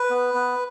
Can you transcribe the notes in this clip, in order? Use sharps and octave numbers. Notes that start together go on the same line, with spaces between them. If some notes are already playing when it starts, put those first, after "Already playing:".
Already playing: B4
B3
B3